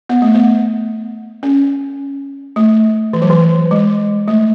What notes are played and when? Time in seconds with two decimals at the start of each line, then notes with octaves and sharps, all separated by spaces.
0.09 B3
0.22 A3
0.34 B3
1.43 C#4
2.56 A3
3.13 E3
3.22 F#3
3.30 E3
3.71 G#3
4.28 A3